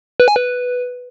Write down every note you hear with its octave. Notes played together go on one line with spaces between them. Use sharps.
B4
G#5
B4